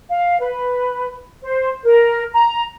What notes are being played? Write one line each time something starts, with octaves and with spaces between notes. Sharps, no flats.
F5
B4
C5
A#4
A#5